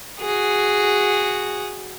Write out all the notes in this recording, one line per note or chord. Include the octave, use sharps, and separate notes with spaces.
F#4 G#4